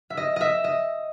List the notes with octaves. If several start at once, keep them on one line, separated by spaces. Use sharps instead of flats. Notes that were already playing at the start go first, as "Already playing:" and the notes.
E5
D#5
D#5 E5
D#5